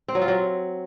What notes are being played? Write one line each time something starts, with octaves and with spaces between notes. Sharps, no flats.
C4
F#3
F4
F#3